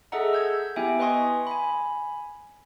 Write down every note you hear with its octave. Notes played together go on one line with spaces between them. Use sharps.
G#4 A4 D#5 E5 F#5 A#5
E6 G6 G#6
B3 E4 G4 E5 G5 G#5
B4 D#5 G#5 C6 C#6 D#6
G#5 B5